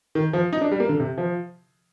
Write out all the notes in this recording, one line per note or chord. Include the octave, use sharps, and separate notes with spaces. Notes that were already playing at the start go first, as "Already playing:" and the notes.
D#3
F3
D#4
D4
G3
A#3
D3
C3
F3